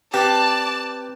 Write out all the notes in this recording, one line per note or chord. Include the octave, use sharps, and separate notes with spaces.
C4 G4 B4 D5 A5 A#5